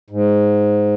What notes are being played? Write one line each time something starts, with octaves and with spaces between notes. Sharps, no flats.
G#2